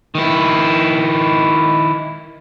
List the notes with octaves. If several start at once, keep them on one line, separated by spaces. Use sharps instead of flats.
D#3 E4